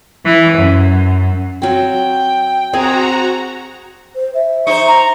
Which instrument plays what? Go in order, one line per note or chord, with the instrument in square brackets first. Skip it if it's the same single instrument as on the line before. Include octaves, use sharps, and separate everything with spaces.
[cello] E3
F#2
[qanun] F#3 C4 [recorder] G5
[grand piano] C4 [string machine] F#4 A#5 [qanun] G#4
[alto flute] C5
E5
[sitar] D#4 C5 [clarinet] C#6
[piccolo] A#5